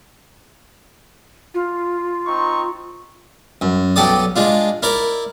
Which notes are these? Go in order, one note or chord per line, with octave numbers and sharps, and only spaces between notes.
F4
C4 D#4 C#6
F#2
B1 G4 A4 D5 D#6
G#3 D4 F4
E4 A#4 D5